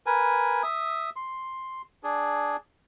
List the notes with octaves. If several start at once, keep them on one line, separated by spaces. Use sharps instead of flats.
A#4 B4 G#5
E5 D#6
C6
D4 G#4